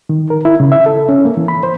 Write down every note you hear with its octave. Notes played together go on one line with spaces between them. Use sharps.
D#3
A#4
E4
C#3
E5
A4
C#4
A#3
E3
B5
C5